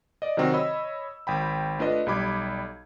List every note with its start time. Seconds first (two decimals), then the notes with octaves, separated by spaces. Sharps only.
0.22 D5 D#5
0.37 C3 D#3 F#3 C4 F#4
0.53 C#5 D#5 B5 E6
1.27 G#1 G5 B5
1.79 A3 D4 F4 B4 D#5
2.07 B1 G3 B5 D6 G#6